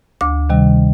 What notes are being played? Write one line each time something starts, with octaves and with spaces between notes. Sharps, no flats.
D2 D6
C3 D#3 G3